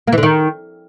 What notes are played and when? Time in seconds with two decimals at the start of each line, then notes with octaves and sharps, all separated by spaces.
0.07 A#3
0.13 E3
0.18 D3
0.23 D#3